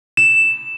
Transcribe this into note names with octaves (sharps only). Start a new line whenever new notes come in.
E7